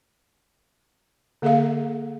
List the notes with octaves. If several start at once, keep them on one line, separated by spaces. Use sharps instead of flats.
D3 A#3 G#4 A4 E5 F5